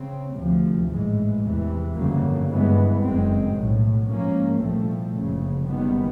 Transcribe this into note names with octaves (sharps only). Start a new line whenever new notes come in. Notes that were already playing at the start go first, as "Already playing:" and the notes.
Already playing: C#3 C4
D2 C3 F3
A1 G#2 E3 G#3
E2 C3 E3
G1 F2 C#3 F#3 A#3
G2 E3 G#3 B3
F#1 F#2 D#3 G#3 C4
B1 A2 F#3
G#2 F3 A#3 C#4
C2 A#2 F3 A3 C4
F#1 F2 C#3
F#1 F#2 D#3 G3 B3